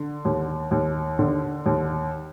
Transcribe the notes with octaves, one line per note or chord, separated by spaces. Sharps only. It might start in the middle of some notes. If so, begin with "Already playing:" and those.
Already playing: D3
D#2
D#2
D3
D#2